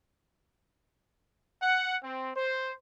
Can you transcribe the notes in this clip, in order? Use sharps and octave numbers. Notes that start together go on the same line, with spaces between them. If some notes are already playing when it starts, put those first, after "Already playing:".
F#5
C4
C5